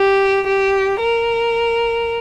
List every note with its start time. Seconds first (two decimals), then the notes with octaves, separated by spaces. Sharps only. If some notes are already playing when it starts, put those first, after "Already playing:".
Already playing: G4
0.46 G4
1.00 A#4